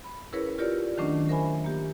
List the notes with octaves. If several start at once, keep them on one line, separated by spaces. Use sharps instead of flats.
B5
C#4 E4 G#4 A#4 B4 C#5
F4 G4 A#4 C#5 D5
D#3 F#3 A3 C#4 D4
A#4 C5 E5 G#5 B5
A#3 G4